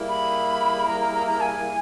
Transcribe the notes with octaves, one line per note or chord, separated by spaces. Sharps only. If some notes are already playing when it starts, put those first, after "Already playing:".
Already playing: G3 A#3 E4 G#4
B5
A#5
A#5
A#5
A#5
G#5